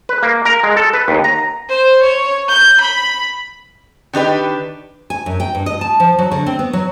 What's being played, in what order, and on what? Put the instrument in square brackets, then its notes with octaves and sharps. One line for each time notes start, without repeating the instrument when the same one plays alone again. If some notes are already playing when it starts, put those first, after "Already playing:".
[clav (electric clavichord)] B4
A#3
A#4
G#3
A4
B4
D#2
A#5
[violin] C5
C#5
G6
B5
[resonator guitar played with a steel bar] D#3 D4 G4 B4
[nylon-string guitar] G#5
F#2
G5
G2
D#5
A5
F3
F#3
D3
C4
B3
F#3